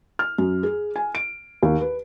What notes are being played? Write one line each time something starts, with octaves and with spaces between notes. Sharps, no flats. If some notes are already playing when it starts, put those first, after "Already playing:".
F6
F#2
G#4
G#5
D7
D#2
B4